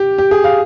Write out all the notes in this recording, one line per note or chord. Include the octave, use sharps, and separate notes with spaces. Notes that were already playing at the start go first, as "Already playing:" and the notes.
Already playing: G4
G4
G#4
F5